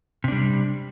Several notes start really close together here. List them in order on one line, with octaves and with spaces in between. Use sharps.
C3 D4 G3